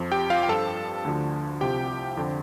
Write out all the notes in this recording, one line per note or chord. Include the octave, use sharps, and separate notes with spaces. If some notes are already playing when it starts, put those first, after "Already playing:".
Already playing: F2 F3
G4 G5
F4 F5
G5
G2 F3 A4 A5
D2 D3 F3
C2 C3 F3 G4 G5
F2 D3 F3